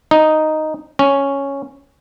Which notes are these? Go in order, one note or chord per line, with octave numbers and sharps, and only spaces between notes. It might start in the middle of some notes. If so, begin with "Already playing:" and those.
D#4
C#4